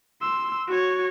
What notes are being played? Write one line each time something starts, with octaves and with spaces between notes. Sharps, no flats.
C6 E6
F#4 C#5